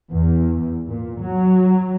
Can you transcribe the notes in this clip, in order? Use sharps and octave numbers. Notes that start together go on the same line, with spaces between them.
E2
A#2
F#3